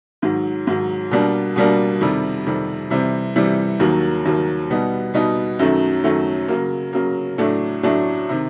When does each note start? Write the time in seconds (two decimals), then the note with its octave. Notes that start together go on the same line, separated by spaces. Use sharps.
0.22 G#2 D#3 F#3
0.67 G#2 D#3 F#3
1.11 B2 G3 A#3 D4
1.56 B2 G3 A#3 D4
2.01 F2 C3 D#3 G3
2.46 F2 C3 D#3 G3
2.90 C3 E3 G3
3.36 C3 E3 G3
3.80 D#2 D#3 F#3 A#3
4.25 D#2 D#3 F#3 A#3
4.70 B2 G3 B3 D#4
5.14 B2 G3 B3 D#4
5.59 F#2 D#3 F#3 A3
6.04 F#2 D#3 F#3 A3
6.48 C#3 F#3 A#3
6.93 C#3 F#3 A#3
7.38 A2 F#3 A3 D4
7.83 A2 F#3 A3 D4
8.29 C3 D#3